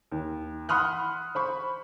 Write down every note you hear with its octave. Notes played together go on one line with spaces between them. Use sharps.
D#2
F#5 B5 C6 D#6 F6 F#6
C5 B5 C#6